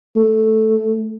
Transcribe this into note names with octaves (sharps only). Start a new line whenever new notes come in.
A3